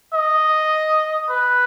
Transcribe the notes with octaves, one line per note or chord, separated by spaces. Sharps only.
D#5
B4